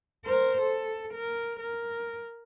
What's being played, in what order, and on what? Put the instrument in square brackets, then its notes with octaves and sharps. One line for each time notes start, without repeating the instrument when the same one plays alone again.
[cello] A#4 C5
A4
A#4
A#4